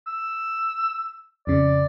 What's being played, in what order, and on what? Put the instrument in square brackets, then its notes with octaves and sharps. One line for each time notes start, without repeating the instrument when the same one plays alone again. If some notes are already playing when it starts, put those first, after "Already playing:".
[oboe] E6
[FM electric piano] F2 C#3 [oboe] D5